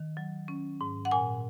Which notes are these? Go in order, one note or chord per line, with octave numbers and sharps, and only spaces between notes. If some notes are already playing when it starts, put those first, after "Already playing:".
Already playing: D#3
F#3
C#4
G#2
F#5
A#2 G#5